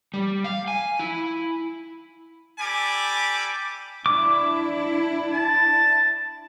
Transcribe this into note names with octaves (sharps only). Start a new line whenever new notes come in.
G3
F5
G#5
E4
G3 A4 G#5 B5 D6
D4 E4 D6
A5